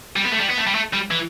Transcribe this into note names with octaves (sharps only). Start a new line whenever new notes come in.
G3
B3
A3
G3
B3
A3
G3
A3
G3
E3